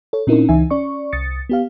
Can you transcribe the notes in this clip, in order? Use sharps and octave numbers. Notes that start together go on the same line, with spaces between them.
A4 C#5
A#2 C4 C#4 D#4 E4 A#4
C#2 E3 D#4 E5 G#5
C#4 D5 C#6
C2 D#6 A6 C#7
B3 G4 F5